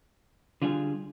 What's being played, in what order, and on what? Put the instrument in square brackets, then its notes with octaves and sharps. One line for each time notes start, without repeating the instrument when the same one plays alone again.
[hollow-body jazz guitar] D3 G3 D4 F4 G#4